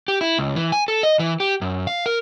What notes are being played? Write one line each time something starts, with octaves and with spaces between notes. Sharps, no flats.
G4
E4
C#2
E3
G#5
A4
D#5
E3
G4
F#2
F5
A#4